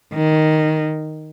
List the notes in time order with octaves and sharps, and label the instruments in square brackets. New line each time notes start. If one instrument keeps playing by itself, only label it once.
[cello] D#3